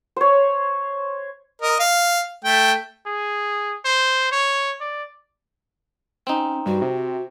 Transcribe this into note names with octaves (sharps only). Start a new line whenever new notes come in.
C5 C#5
A#4 D#5
F5
A3 G5
G#4
C5
C#5
D5
C4 C#4 D#4
G2 F#4
C3